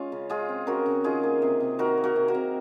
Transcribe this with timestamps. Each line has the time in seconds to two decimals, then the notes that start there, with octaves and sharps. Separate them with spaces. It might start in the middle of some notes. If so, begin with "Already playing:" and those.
Already playing: G#3 C#4 F4
0.12 C#3
0.29 G#3 F4 G#4
0.49 C4
0.67 C#3 F#4 A#4
0.86 C#3
1.04 D#3 F4 G#4
1.23 A#3
1.42 C3
1.60 C3
1.79 D#3 F#4 A#4
1.97 A#3
2.04 F#4 A#4
2.16 C3
2.28 F#4 A#4
2.34 C3